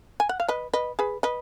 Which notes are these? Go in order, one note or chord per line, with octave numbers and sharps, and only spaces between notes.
G#5
F#5
F5
B4 D#5
B4 D#5
G#4 B4
B4 D#5